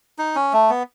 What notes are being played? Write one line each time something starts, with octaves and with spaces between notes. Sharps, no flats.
D#4
C#4
A3
B3